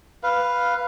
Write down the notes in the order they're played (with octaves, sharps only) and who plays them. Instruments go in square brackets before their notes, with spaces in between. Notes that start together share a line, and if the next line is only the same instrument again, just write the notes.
[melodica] B4 F5